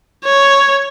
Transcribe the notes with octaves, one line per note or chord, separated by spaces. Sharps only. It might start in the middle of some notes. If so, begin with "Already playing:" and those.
C#5